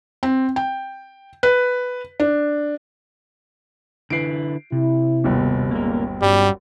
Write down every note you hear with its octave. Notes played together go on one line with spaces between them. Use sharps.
C4
G5
B4
D4
D3 E4 B4 C7 D7
C3 E4
G1 D#2 B2
A#2 C#3 G#3 A#3 A#4
G2 F#3 G3 C#4 F#4